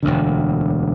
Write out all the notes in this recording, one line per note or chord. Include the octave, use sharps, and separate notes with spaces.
E1 D2 D3